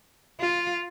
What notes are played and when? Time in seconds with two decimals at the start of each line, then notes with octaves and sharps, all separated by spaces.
0.40 F4